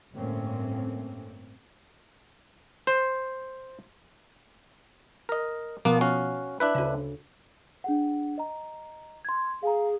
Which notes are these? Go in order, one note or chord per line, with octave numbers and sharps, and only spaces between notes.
G1 A2 A3 A#3 C4 C#4
C5
A#4 D#5
B2 F3 A#3 B3
C#4 F#4 F5
D4 E4 B4 F#6
D2 C#3
D4 G#4 F#5
D#5 A#5
C6 G#6
G#4 F5 G#5 A#5